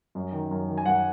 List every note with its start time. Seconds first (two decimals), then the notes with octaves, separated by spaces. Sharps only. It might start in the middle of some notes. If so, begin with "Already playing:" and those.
0.15 F#2
0.33 D#3
0.51 F#2
0.68 D#3
0.78 G#5
0.86 F#2 F#5